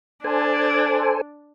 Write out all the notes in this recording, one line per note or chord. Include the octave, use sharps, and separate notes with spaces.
D4 A4 C5 G#5